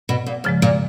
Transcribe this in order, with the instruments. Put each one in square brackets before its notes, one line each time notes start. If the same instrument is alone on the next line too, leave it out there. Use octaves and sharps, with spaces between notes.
[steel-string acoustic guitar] B2
A#2
[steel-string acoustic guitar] G#2 [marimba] C#3 F3 G#3
[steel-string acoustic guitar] A#2